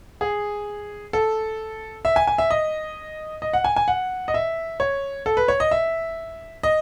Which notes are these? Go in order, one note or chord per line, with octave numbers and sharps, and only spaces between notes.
G#4
A4
E5
G#5
G#5
E5
D#5
D#5
F#5
G#5
G#5
F#5
D#5
E5
C#5
A4
B4
C#5
D#5
E5
D#5